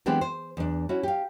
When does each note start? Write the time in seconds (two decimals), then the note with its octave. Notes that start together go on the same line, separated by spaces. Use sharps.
0.06 E3 G#3 B3 C4 D4 G4
0.21 C5
0.57 E2 D4
0.89 C#4 E4 F#4
1.03 G4 F5